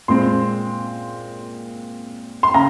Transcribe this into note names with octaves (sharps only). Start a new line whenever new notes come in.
A#2 G#3 C4 C6
C6
C#3 A#5